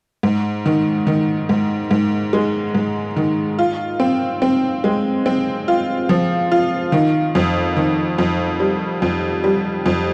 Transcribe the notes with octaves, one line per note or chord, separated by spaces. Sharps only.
G#2
D#3
D#3
G#2
G#2
G#3
G#2
D#3
F4
C4
C4
G#3
C4
F4
F3
F4
D#3
F2
D#3
F2
G3
F2
G3
F2